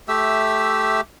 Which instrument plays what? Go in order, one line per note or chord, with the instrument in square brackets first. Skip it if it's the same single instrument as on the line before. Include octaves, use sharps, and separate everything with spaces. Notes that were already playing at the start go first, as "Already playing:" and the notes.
[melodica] A3 G4 E5 E6